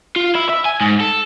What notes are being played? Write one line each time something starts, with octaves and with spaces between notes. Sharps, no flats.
F4
E4
E5
G#5
G#2
A4